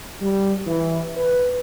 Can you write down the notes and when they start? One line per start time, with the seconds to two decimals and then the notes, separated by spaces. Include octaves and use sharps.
0.21 G3
0.67 E3
1.16 B4